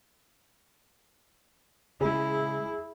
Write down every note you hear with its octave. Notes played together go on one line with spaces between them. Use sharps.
C#3 G#3 E4 G#4